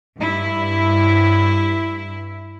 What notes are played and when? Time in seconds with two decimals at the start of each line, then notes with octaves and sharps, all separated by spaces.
0.18 G2 E4